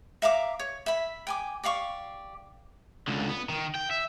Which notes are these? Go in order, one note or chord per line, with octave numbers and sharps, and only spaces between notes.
E5 F5 A#5 D6
C#5
E5 B5
G5 G#5 D6
G4 D5 F5 C#6
C#2 D3
B3
D#3
G5
E5